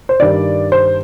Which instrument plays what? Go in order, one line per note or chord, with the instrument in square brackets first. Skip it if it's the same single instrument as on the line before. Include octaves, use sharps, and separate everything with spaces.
[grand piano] C5
G2 D#3 G3 D5
C5